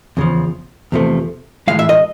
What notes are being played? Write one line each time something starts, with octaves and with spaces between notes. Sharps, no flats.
E2 C#3 F3
E2 C3 F3 A3
A2 E3 G#3 F5
E5
D#5